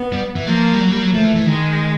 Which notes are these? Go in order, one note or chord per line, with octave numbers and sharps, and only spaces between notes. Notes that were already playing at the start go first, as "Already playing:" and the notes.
Already playing: B3
G3
E3
F3 A#3
G3
F#3
G3
F#3
F3 A3
E3
E3
D#3 G#3